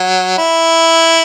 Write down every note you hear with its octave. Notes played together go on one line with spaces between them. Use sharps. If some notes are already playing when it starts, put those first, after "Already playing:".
Already playing: F#3
E4